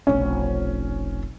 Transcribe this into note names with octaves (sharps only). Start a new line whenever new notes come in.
F1 B1 C#4